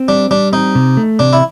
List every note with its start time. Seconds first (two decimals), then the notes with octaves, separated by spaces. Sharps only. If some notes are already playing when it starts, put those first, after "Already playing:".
Already playing: C4
0.08 G3 D4
0.31 G3 D4
0.52 C4 D#4
0.75 C3
0.97 A3
1.19 C3 D4
1.33 E4